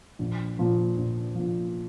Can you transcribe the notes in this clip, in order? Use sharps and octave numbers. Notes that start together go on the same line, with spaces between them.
A#1
A#2 F3
A#1
A#2 F3